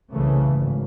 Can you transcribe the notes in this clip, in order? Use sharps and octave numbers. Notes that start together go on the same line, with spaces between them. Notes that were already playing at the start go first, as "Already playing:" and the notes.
C2 C#3 E3 A3
G#1